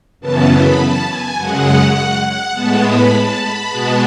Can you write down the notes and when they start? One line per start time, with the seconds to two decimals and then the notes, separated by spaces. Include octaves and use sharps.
0.20 F#2 C#3 E3 B3 A5
0.50 B5
0.79 A5
1.08 G#5
1.38 F#2 C#3 G#3 F#5
2.24 F#5
2.54 A2 G#3 B3 A5
2.83 B5
3.12 A5
3.41 B5
3.70 B2 G#3 B3 A5